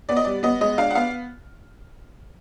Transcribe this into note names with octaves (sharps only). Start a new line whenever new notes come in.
B3 D5
D#5
G3 D5
B3 D#5
G#3 D#5
D4 F5
F#5
B3 F5